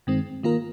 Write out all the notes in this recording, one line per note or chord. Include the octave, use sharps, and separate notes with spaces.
G2 D#3 G#3 C4
D#3 A#3 F4 A#4